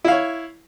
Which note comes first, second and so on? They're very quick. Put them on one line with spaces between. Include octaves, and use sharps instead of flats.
E4 F5 C#5